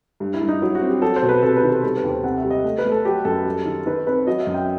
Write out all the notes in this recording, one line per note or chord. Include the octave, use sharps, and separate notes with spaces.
G2
E4
G2
D#4
F#3 E4
F#4
C4
G4
F#3 A4
C5
B2
B4
C3 A4
B4
D#3
A4
G3 A4
B4
D#2
C5
C3 F#5
E5
G3
D#5
A3
B4
A3
A4
F#3 G4
F#2 A4
G3
D#3
D#3 B4
C4 B4
F#3 D#5
E5
F#2
G5